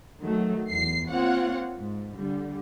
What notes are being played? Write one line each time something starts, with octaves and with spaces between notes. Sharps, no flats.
D#3 F#3 A3
E2 C7
A#3 C4 F4 C#5 F#5
G#2
D3 G3